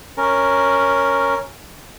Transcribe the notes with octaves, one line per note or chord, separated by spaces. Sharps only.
C#4 A#4